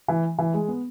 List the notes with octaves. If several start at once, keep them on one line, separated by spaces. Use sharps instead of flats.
E3
E3
G#3
B3